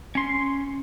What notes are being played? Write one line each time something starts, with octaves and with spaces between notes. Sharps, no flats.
C#4 C6